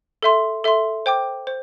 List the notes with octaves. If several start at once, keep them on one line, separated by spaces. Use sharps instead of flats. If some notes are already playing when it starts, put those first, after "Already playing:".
A4 E5 C6
A4 E5 C6
C5 G5 D6
C5